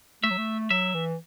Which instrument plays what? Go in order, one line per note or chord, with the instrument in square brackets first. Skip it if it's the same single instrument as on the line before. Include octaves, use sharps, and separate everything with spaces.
[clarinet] A3 [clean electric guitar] E5
[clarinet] F#3
A3
[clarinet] F#3 [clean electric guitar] E5
[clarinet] E3